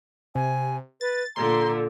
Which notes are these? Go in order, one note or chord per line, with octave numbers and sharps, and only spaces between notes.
C3 G#5
B4 A6
A#2 D3 A#5 C6